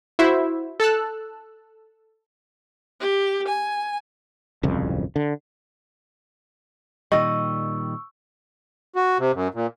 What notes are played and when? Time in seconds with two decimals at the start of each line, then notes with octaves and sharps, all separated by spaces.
0.19 E4 F#4 C5 E5
0.80 A4 A5 E6 F#6
3.00 G4
3.48 G#5
4.63 D1 C2 F2 C#3
5.16 D3
7.12 A#2 D#3 G3 D#5 C#6 E6
8.96 F#4
9.19 C3
9.34 F#2
9.54 A#2